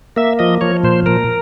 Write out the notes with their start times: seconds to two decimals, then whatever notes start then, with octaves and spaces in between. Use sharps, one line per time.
0.17 A#3 E5
0.39 F3 D#5
0.61 F3 C#5
0.83 A#2 C5
1.06 A#2 A#4